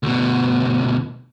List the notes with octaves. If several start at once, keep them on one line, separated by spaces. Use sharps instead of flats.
D2 B2